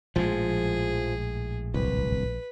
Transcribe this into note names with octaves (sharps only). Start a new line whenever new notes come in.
A#1 A2 F3 G#3 G#4
D1 C2 B4